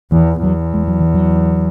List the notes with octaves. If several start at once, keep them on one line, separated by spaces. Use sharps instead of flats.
E2 E3
E2 F#3
G#3
F#3
E3
F#3